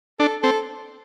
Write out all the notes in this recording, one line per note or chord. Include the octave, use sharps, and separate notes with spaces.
D4 A4
C4 A4